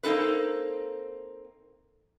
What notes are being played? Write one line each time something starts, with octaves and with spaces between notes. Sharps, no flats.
A#3 C4 D#4 A4 B4